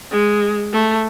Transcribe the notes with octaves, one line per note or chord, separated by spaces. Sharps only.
G#3
A3